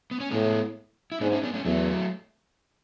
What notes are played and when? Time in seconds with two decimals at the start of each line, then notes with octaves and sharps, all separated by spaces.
0.11 B3
0.20 C#4
0.31 A2 G#3 B3
1.12 E4
1.21 G#2 B3 D4
1.32 C#4 E4
1.43 B3 D4
1.54 A3 C#4
1.65 E2 F#3 A3